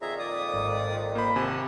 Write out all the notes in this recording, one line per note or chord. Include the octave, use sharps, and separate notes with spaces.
F2 A#2 D#3 G#4 E5 A#5
D5 D#6
G#1
A#3 C5 B5
D#2 C3 F#5 G#5 A5